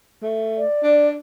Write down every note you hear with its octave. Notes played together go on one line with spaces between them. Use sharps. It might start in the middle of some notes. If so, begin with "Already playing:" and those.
A3
D5
D4